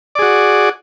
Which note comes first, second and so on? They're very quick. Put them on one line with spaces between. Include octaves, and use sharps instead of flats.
D5 G#4 F#4